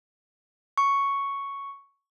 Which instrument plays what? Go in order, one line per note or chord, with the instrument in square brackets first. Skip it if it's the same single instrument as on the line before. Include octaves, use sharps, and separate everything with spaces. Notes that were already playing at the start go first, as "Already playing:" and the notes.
[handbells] C#6